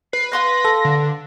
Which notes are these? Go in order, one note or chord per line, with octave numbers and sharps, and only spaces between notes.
B4 C7
F5 C6 F#6 A#6
A4
D3